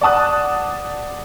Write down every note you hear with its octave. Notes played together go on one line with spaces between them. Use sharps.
D5 F#5 A5 D#6 F#6